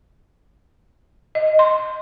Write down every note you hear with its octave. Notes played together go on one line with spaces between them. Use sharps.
D#5
C6